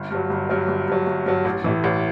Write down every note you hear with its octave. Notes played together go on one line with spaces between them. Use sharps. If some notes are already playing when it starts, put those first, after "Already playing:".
Already playing: G1
G2 F#3
G1
G2 F#3
G1
G2 F#3
G1
G2 F#3
A1
A2 E3
A1